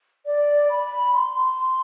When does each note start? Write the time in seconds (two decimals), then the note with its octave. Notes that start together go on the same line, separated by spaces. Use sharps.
0.26 D5
0.70 B5
1.13 C6